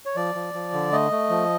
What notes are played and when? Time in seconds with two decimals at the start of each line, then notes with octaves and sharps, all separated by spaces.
0.06 C#5
0.16 F3 D5
0.35 F3
0.54 F3
0.73 D3
0.92 A3 D#5
1.11 A3
1.30 F3